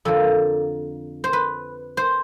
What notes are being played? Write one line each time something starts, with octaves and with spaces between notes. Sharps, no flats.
F2 D3 F3 A#3 A4
C5
B4
C5